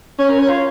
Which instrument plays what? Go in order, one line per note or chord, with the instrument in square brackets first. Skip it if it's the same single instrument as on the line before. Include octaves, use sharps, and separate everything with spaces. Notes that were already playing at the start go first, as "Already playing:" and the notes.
[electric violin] C#4 [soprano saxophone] C#5
[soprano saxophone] A#4
C#5
F4